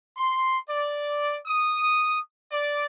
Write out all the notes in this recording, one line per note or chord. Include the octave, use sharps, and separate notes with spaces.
C6
D5
D#6
D5